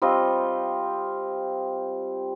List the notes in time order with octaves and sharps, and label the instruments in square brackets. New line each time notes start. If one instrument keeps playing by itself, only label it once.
[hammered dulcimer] G3 C4 F4 D#5